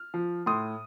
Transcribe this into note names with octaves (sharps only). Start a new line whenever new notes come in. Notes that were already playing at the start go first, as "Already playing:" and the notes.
Already playing: F6
F3
A2 C6 D#6